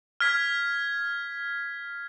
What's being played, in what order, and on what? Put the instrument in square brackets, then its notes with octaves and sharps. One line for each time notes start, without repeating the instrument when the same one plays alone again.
[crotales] F6 G#6 B6